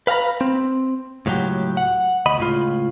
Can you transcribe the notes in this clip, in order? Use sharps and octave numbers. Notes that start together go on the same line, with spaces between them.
B4 F5 F#5 A#5 B5
C4
C#2 A2 E3 F#3 G4
F#5
D2 D#5 B5
C#2 A2 F4